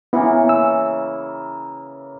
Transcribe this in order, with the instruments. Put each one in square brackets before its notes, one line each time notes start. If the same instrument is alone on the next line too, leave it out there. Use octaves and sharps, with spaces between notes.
[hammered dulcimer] C#3 E3 A#3 [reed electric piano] B3 E4
[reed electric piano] E6